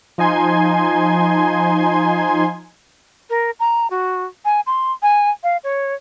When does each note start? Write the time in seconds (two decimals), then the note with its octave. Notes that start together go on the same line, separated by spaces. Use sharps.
0.18 F3 D#4 G#5 C6 G#6
3.30 A#4
3.60 A#5
3.90 F#4
4.45 G#5
4.67 C6
5.02 G#5
5.43 F5
5.64 C#5